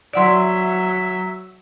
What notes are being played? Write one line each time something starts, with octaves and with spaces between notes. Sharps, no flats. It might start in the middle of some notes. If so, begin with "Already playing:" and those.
F#3 D5 E5 F#5 C6